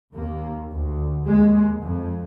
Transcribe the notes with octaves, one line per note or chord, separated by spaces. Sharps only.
D#2 A#3
D2
D#2 G#3
F2